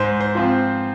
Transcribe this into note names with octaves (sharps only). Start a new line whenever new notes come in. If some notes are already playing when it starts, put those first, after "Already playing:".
Already playing: G#2 C5
C5
F3 C4 F4